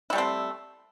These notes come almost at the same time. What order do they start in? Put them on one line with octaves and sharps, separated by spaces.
E4 G3 A3 C4